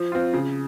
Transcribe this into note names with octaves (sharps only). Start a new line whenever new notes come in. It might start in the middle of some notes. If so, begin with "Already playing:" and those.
Already playing: F3
C4 F4
C#3